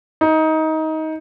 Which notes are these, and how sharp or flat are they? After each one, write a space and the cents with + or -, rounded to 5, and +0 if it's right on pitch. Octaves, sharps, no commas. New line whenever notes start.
D#4 +20